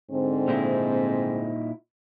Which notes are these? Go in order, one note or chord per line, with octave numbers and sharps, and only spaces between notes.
G#2 D3 C4
A#2 D#4 E4